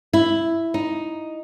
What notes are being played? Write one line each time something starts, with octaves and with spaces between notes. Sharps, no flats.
E4
D#4